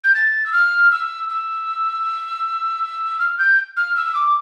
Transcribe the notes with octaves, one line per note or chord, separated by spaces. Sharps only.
G6
A6
E6
F6
E6
E6
F6
G6
F6
E6
D6